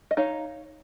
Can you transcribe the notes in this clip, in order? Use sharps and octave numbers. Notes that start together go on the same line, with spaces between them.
D#5
D#4 C#5 F5